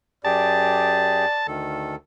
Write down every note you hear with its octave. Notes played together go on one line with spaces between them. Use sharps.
F#2 G4 G#4 D5 A5
D2 D#3 A4